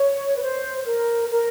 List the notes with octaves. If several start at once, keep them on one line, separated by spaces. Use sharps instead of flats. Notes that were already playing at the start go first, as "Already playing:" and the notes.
Already playing: C#5
B4
C5
A#4
A#4